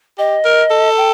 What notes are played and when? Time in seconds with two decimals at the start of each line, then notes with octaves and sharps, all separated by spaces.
0.18 G4 D#5
0.44 A#4
0.70 A4
0.97 G5